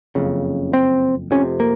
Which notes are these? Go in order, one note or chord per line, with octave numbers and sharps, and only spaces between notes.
F#1 F2 C#3
C4
F1 F2 C3 C#4
A#3